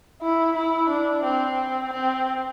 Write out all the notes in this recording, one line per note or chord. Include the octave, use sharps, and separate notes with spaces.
E4
E4
D4
C4
C4